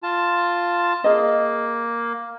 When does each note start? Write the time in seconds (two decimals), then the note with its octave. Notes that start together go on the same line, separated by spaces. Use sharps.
0.03 F4 A5
1.04 A#3 G#4 D#5